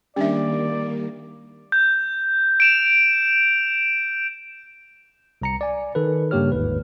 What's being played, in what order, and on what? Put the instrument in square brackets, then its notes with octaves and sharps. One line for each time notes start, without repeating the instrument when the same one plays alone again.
[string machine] D#3 A#3 [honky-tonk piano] G3 [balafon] C#4 D4 E5 [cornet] D5
[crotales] G6
D7 E7 F7
[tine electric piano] C2 A#5 C#7
D5 G#5
D#3 A4 B4
G2 C#3 A#3 G4 C#5 F6
G1 D#2 G#2 B4